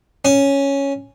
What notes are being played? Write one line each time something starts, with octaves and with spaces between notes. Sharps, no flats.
C#4